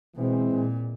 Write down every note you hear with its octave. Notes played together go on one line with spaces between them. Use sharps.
B2 E3 G#3 C4
A#2